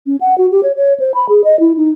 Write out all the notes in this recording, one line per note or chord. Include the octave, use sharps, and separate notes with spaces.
C#4
F#5
F#4
G4
C#5
C#5
C5
B5
G#4
D#5
E4
D#4